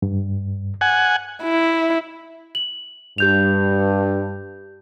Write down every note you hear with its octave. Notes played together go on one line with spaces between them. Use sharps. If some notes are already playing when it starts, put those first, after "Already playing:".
G2
F#5 G#5
E4
F#7
G2 G4 G6 F7